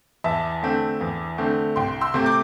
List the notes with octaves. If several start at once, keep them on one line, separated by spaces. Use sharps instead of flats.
E2 E5 A5
D3 A3 C4
E2
D3 A3 C4
C2 G5 C6
C6 E6
C3 A3 C4
D6 G6